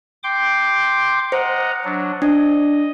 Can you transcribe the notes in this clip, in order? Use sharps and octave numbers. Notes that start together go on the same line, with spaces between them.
G5 C6 D6
C5 D#5 F#5 A#5
F#3 D4
D4 D#5